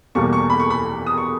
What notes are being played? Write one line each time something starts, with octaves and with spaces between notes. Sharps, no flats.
E2 B2 G3 A#3 C#6
C#6
B5
C#6
B5
D#6
C#6